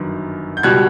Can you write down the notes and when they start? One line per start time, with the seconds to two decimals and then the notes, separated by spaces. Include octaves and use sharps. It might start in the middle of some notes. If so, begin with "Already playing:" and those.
Already playing: G1 F#2 D#3
0.57 G6
0.63 C#2 B2 G3 F#6 G#6